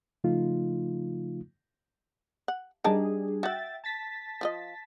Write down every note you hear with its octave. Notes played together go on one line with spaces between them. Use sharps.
C#3 F3 A3 D#4 F4
F#5
G3 D4 D#4 G#4 A#4 A5
F#4 E5 F#5 G5 A6
A5 A6 B6
F3 F4 D#5